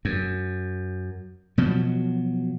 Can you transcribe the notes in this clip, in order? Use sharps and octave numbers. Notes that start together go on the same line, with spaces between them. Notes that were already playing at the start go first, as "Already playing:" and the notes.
F#2
B2 F3 F#3